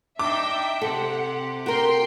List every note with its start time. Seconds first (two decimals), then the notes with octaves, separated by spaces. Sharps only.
0.19 D4 D#4 E5 G5 D6
0.81 C3 G4 A4 F#5
1.66 F#4 A#4 G5 C6